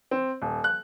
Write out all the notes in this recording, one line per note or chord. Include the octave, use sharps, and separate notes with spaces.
C4
D#1
F#6